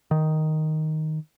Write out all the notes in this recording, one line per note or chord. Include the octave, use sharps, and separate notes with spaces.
D#3